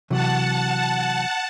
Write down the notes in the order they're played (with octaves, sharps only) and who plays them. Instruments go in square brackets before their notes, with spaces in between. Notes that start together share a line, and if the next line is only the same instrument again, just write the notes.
[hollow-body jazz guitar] C3 E3 F#3 [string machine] F#5 A5